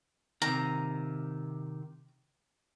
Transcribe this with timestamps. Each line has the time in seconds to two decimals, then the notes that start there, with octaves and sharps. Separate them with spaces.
0.42 C3 D#3 A#5